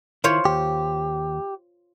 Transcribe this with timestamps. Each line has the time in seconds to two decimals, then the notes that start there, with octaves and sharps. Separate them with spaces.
0.24 D#3 E4 F4 C5 C#5
0.45 D#2 G4